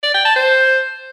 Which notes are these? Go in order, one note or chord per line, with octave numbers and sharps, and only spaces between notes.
D5
G5
A5
C5